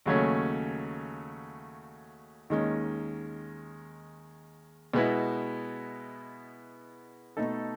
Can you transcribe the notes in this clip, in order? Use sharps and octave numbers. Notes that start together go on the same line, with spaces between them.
D#2 C#3 F#3 A3 C#4
D#2 D#3 G#3 C#4
B2 G#3 B3 E4
B2 A3 D#4 A4